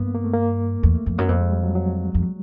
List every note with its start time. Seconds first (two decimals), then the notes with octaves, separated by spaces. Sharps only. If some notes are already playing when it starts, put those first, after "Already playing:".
Already playing: G2 A#3 B3
0.15 A#3
0.24 A3
0.34 A#3
0.83 E2 A3
1.06 F2
1.18 F#2
1.25 B3
1.29 F2 A#3
1.41 G#3
1.52 G3
1.63 F#3
1.75 F#3
2.14 F2